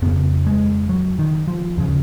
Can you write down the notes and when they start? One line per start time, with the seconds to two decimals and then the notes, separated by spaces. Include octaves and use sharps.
0.02 F2 C#3 B3
0.47 G#3
0.89 F#3
1.19 D#3
1.47 F3
1.77 D#2 C#3 F3